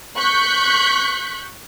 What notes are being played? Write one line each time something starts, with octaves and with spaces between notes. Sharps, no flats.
C#6 F#6 G6 B6